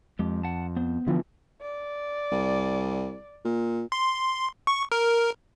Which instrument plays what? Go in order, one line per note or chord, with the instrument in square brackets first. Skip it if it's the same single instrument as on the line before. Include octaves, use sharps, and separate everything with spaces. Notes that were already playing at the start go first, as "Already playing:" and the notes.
[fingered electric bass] F2 [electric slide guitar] G#3 G4
[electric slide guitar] F#5 A5
B3 C5
[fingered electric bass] D3 E3 F3
[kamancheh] D5
[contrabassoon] C2
A#2
[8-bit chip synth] C6
C#6
A#4